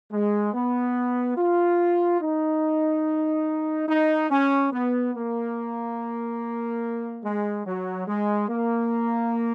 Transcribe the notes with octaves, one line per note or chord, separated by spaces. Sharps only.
G#3
B3
F4
D#4
D#4
C#4
B3
A#3
G#3
F#3
G#3
A#3